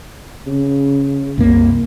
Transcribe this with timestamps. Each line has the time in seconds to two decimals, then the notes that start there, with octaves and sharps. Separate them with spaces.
0.47 C#3
1.38 C2 F#2 A#3